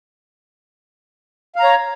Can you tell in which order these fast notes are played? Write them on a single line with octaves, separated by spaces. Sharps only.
F5 A#5 C#5